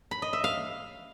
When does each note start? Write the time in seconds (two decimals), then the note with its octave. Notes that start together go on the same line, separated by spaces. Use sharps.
0.11 B5
0.22 D#5
0.33 E5
0.44 F5